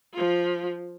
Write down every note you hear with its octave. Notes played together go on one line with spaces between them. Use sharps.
F3 F4